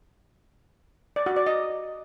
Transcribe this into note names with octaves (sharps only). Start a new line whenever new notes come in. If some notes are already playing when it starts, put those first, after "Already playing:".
D5
F#4
D5
D#5